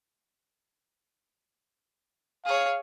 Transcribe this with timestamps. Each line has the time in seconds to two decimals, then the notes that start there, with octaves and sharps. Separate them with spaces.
2.45 G#4 C#5 F5